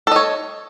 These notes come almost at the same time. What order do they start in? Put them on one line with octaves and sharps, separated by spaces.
A4 D#5 C#5